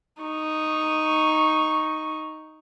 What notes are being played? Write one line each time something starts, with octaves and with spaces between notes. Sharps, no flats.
D#4 C#6